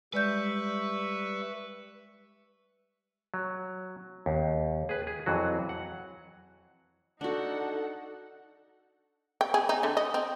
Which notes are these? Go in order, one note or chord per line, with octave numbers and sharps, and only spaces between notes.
G3 G#3 B4 D5 E5 C#6 G6
F#3
D#2
G#4 B4
G#4
F2 E3 F#3 F#4
F#5
D4 D#4 F#4 A4 F#5
G5
G#4
D#4
D3
D#5
C4